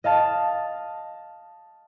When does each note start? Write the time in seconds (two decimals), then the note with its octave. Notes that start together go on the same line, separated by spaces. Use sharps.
0.04 D#5 F5 A5 A6